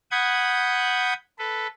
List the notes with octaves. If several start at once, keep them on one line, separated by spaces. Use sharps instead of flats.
F#5 B5 D#6 G6 G#6
A4 B4